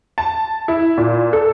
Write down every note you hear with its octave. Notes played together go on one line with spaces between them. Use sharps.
A5
E4
A#2
A4